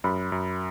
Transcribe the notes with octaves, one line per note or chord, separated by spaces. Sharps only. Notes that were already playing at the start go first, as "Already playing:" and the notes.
F#2 B5
F#2